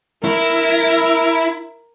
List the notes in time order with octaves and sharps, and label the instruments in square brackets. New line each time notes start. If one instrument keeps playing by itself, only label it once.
[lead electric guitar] E4 [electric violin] A#4